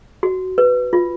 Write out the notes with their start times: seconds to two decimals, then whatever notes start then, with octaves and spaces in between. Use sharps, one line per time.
0.23 F#4
0.58 B4
0.93 F4